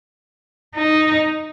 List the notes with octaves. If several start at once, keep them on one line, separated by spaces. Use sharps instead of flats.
D#4